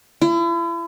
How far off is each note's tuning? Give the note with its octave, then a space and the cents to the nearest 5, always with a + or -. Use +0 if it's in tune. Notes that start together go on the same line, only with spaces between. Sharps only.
E4 +40